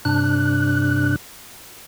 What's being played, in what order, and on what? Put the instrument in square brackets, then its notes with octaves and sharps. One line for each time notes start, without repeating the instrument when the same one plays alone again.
[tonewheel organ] G2 C3 D4 F#6